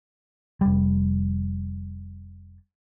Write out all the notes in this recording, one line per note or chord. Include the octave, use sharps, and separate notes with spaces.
F1 G3